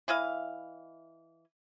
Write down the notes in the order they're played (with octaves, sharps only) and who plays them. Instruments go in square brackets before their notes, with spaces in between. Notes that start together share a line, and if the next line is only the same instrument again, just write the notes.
[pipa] E3 E4 D#5 F5